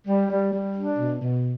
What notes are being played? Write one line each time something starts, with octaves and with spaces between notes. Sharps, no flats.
G3
G3
G3
D4
B2
B2